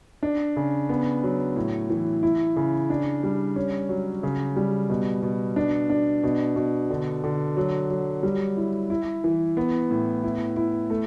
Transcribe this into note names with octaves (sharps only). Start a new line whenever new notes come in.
D4
C#3
B3
F#3
A2
E3
E4
C#3
D4
G3
C#4
F#3
C#3
G3
B2
B2
D4
D4
B2
B2
D3
D3
F#3
F#3
G3
E4
E4
E3
B3
A2
E4
E4
A3